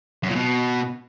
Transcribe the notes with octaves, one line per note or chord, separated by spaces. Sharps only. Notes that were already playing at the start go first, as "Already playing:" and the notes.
F#2
A#2
B2